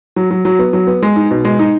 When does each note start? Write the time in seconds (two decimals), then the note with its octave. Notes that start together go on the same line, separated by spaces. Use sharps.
0.16 F#3
0.31 F#3
0.45 F#3
0.59 B3
0.73 F#3
0.87 B3
1.02 G#3
1.16 D#4
1.31 B2
1.45 G#3
1.59 D#4